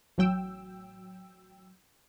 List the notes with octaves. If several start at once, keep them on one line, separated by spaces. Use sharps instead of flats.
A1 F#3 G5 E6